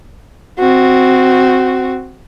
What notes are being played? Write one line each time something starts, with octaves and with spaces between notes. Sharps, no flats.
C4 F#4